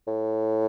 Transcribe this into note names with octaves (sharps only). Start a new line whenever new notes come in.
A2